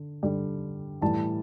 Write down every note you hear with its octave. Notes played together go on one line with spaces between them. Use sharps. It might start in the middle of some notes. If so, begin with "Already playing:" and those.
Already playing: D3
D3 G3
A2 E3 G3 A5